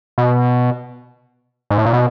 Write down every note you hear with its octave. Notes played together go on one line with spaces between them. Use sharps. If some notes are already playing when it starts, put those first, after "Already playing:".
B2
G#2
A2
A#2
B2